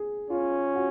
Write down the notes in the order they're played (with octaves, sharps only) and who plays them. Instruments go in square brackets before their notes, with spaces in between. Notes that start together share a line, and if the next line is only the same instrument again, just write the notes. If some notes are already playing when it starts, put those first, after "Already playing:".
Already playing: [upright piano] G#4
[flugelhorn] C#4 [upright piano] F4
[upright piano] F#4